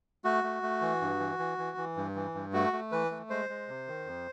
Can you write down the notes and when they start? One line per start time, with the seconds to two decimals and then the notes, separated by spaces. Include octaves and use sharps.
0.24 A3 F#4
0.44 A3
0.63 A3
0.81 E3
1.01 G2
1.20 E3
1.39 E3
1.58 E3
1.77 E3
1.97 G2
2.15 E3
2.34 G2
2.53 A3 F#4
2.73 A3
2.92 E3 B4
3.11 A3
3.30 G#3 C5
3.49 G#3
3.68 C3
3.88 D#3
4.06 F2